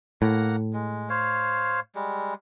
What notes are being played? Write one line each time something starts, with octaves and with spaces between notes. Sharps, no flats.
A2 A#3 F#5 A#5
G#3
C5 C#5 F5
G3 G#3